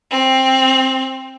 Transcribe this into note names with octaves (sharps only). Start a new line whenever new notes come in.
C4